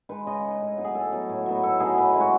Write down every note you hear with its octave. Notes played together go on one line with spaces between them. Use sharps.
G#3 D#4 B4
C#3 D#5
G#3 D#4
A2
F#3 B3 D#4
G#4
A2 A4
F#3 B3 D#4
A2
F#3 B3 D#4
A2 A4
F#3 B3 D#4 G#4
A2 B4
G#3 C#4 E4
F#4